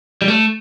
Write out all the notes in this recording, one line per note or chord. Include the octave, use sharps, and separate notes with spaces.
G3
A3